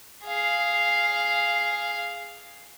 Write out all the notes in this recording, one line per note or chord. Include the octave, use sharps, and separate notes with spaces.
G#4 F5